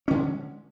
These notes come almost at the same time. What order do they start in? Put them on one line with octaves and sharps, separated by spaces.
C#4 D3 G#3